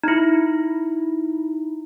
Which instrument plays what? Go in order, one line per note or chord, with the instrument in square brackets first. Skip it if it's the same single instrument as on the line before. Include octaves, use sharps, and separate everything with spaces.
[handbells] D#4 E4